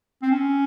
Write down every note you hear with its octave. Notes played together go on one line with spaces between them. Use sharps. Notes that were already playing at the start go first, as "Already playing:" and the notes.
C4
C#4